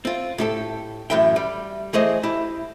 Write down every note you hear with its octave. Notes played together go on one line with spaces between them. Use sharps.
C4 F4
A2 G4 A4
F#2 A2 E3 E5 G5
G3
E3 A3 G#4 C5 D#5
E4 G4